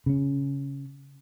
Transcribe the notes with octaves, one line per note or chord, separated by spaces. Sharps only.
C#3 C#4